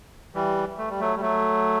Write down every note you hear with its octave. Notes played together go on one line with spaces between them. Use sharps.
E3 G3
A3
G3
F#3 A3
G3
F#3 A3